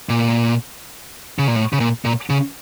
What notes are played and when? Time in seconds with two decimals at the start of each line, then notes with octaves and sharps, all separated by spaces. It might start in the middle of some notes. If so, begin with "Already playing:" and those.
0.09 A#2
1.39 C#3
1.48 A#2
1.56 A2
1.73 C#3
1.80 A#2
2.05 A#2
2.30 C#3